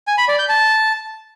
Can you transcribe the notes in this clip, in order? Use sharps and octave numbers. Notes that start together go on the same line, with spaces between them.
G#5
B5
D5
G6
A5